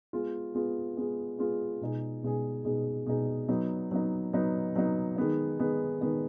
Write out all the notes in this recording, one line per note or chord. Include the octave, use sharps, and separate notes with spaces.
G#3 B3 F4 G#4
G#3 B3 F4 G#4
G#3 B3 F4 G#4
G#3 B3 F4 G#4
B2 G#3 D#4 G#4
B2 G#3 D#4 G#4
B2 G#3 D#4 G#4
B2 G#3 D#4 G#4
F#3 B3 D#4
F#3 B3 D#4
F#3 B3 D#4
F#3 B3 D#4
D#3 G#3 B3 D#4
D#3 G#3 B3 D#4
D#3 G#3 B3 D#4